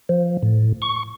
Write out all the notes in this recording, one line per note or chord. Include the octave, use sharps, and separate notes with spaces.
F3
A2
C#6